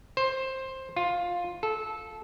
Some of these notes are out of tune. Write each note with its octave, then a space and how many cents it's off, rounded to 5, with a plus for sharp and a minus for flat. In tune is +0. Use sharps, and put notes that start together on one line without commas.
C5 +15
F4 +10
A4 -20